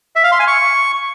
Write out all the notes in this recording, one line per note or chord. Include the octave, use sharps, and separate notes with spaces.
E5
F5
C6
G#5
C#6